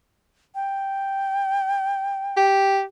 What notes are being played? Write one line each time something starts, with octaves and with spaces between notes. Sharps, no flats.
G5
G4